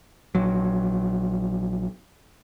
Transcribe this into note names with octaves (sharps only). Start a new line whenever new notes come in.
A#1 F#3